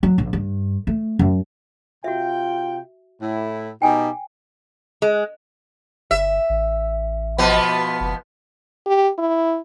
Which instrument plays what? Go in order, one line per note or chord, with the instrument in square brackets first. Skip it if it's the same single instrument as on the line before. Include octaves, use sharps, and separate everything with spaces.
[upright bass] F#3
A#1
G2
A3
F#2
[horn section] C3 F4 G5 [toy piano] F#4 E5
[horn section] A2 E4
[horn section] B2 D#4 G4 [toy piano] G5 G#5
[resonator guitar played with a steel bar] G#3
[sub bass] G1 [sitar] E5
[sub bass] A1
[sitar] B2 F3 B3
[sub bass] F#1
[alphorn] G4
E4